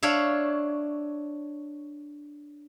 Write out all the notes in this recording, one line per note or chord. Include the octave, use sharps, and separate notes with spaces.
D4 C#5 E5 F5